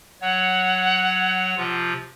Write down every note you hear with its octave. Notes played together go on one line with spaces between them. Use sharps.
F#3 C#5 F#5
C3 F3 F4